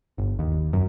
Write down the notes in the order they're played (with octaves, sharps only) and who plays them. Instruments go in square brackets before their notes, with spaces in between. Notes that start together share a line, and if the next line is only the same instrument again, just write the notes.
[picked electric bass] G1
D#2
F#2